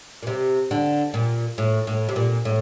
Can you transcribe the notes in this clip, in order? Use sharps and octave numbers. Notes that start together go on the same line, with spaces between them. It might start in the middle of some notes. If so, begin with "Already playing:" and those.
A#2
C3
D3
A#2
A2
A2
C3
A#2
A2